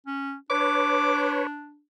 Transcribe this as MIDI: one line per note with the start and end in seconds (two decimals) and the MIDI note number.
0.07 0.35 61
0.50 1.82 62
0.50 1.47 71
0.50 1.47 73
0.50 1.41 86